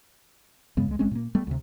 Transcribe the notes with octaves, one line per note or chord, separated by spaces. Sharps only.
G2 C#3 G#3 B3
C#2 G#3
G#1 G#3 C4 C#4
A#2 A#3
G3 A3 B3
D2 C3